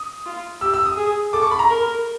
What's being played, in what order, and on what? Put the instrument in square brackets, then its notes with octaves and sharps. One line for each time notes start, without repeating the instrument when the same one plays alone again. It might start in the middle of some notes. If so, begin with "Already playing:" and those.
Already playing: [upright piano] D#6
[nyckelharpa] F4
[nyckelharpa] G4 [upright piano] E6
[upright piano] E6
D#6
[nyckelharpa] G#4
[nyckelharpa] A4 [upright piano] D6
[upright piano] C#6
B5
A#5
[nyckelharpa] A#4